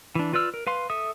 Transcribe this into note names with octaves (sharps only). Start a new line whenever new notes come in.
E3 D4
F4 B4 D5 E6 F6
A#4
B4 F5 C6
A4 E5 D#6